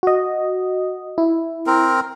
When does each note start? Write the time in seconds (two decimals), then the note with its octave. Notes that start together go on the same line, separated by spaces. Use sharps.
0.03 F#4 D#5
1.18 E4
1.67 C4 A#4